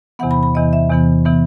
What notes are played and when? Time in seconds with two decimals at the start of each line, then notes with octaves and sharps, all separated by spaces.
0.19 E2 C3 E3 B3 F#5
0.31 B5
0.43 B5
0.54 E2 C3 E3 B3 D#5
0.73 E5
0.89 E2 C3 E3 B3
1.25 C3 E3 B3